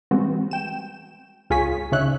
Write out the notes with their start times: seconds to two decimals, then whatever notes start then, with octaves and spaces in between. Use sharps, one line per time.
0.11 E3 G3 G#3 B3 C4 F#4
0.51 G5 E7
1.50 C#2 F4 G#4 C#5 G#5 B6
1.92 C#3 D#4 C#5 E5 F#6